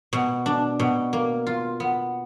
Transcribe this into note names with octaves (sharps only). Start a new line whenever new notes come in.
B2
D4
B2
A#3
F4
B3